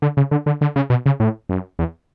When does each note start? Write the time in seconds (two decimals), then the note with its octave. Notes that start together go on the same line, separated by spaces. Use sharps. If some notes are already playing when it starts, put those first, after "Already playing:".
0.02 D3
0.17 C#3
0.31 D3
0.46 D3
0.61 D3
0.76 C#3
0.90 B2
1.06 C#3
1.20 A2
1.49 F#2
1.79 E2